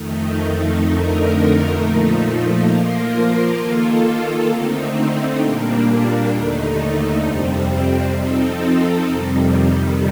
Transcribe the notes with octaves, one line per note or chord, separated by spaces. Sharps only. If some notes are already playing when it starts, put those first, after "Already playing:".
Already playing: F2 D#3 A3 D#4
F2 D3 A3 D#4 A#4
A#2 F3 A3 D#4
F3 A#3 F4 A#4
D#3 A#3 F4 A4
D3 A3 C4 D#4
A#2 G3 A#3 D4
D#2 D3 A3 D#4
F2 C3 G3 C4
F3 C4 D#4 A4
F2 C3 D#3 G3